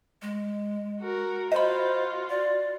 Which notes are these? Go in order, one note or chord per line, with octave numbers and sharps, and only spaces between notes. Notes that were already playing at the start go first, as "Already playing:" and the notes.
G#3
F#4 A#4
F4 F#4 C5 D#5 B5
D5